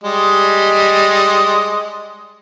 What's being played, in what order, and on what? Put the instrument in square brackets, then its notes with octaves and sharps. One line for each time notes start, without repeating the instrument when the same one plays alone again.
[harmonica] G3 G#3 D#5